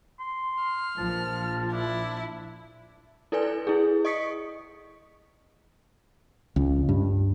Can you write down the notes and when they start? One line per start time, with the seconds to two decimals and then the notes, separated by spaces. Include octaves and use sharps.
0.19 C6
0.64 F6
0.98 A#1 F3 A5
1.72 D4 E4
3.32 E4 A4 B4 D5 G#5
3.67 E4 G#4
4.05 D#5 C#6 D#6 B6 C#7
6.56 C#2
6.89 G2